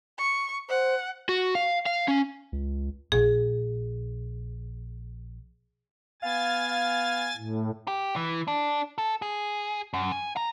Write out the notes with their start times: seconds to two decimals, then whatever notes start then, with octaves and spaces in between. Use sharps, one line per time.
0.18 C#6
0.69 C5 F#5
1.29 F#4
1.55 F5
1.86 F5
2.08 C#4
2.52 C#2
3.12 A#1 G#4
6.22 B3 F5 G#5 A6
7.37 A2
7.88 G4
8.16 E3
8.48 D4
8.98 A4
9.22 G#4
9.94 F#2
10.12 G#5
10.37 A#5